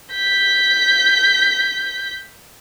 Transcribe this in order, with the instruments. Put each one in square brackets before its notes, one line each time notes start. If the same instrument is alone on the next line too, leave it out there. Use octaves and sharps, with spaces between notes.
[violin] G6 B6